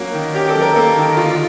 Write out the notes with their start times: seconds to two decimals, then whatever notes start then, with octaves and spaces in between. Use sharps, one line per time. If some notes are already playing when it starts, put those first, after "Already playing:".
Already playing: F#3 A#3 C#4 F#4
0.13 D#3
0.34 C#4 G4
0.48 A4
0.55 F#3
0.61 A#4
0.76 A#3 A4
0.96 D#3
1.17 D3 F4
1.30 F4